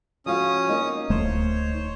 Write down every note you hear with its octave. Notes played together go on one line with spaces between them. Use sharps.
F3 C#4 F#4 F5 D#6
A#3 D#4
D1 A3 C5 C#5